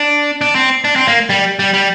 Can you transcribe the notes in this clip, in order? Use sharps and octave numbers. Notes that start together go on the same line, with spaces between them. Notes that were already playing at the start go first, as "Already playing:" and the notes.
Already playing: D4
D4
C4
D4
C4
A#3
G3
G3
G3